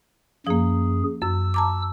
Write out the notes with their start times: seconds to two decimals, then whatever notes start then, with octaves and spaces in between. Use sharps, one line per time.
0.47 F#2 F3 A#3 G#4
1.22 F#2 E6
1.54 A5 A#5 D6